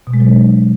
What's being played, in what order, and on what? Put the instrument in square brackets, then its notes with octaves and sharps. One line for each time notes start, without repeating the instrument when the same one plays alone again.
[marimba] B2
G#3
F#3
D4